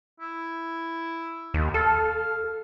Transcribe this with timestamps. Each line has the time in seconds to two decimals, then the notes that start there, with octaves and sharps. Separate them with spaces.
0.20 E4
1.54 D#2
1.74 A4 F5